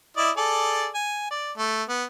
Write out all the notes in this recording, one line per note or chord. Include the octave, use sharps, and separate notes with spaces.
E4 D5 D#5
G#4 A4 D5
G#5
D5
A3
B3